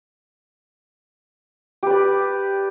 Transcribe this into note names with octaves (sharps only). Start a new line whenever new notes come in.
G4 B4 D5